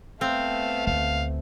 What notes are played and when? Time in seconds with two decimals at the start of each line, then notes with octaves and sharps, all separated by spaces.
0.21 A3 B3 C4 F5
0.87 D2 F5